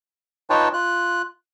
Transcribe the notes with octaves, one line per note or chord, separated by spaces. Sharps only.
D#4 F4 B4 C#5 G5 A5
F4 F#6